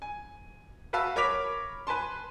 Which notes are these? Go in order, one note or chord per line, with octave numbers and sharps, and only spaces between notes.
G#5
F#4 B4 E5 F5 A5 E6
A#4 C#5 B5 D6 B6 F7
B4 G#5 A5 C6